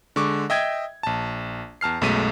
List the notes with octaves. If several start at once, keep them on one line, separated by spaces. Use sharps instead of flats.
D3 G#3 C#6 D6
D#5 E5 G5 D#6 G#6
A#1 A5
E2 A5 F6 C7
B1 F#2 G#3 A3 B6 D#7